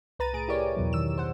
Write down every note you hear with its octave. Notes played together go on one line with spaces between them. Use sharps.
C2 B4 A#5 A6 D#7
A2 G#4 D7
E4 G4 A#4 C#5 D5
E2 B2 F#3
D#3 E6 E7
C5 F#5